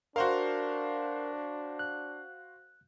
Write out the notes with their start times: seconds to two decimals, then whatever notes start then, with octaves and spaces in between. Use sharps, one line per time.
0.16 D4 F#4 A#4 C5 F5
1.79 F#6